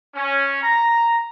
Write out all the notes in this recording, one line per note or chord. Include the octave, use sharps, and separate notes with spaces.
C#4
A#5